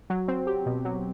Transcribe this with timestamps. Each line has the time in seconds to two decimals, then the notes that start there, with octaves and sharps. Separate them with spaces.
0.10 F#3
0.28 C4
0.47 G4
0.66 B2
0.85 F#3